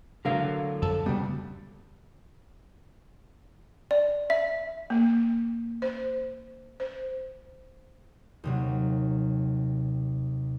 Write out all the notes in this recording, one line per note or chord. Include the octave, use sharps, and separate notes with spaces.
A2 D3 F#3 A3 A#4 F5
F2 A4
D2 G2 C#3 G3 B3
D5
E5
A#3
C5
C5
D#2 C3 F#3